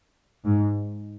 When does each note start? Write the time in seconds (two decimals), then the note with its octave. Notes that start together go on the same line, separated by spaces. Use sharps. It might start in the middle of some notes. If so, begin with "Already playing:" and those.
0.45 G#2